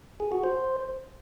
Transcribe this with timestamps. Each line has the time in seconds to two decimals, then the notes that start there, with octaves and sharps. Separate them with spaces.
0.20 G#4
0.32 F#4
0.44 C5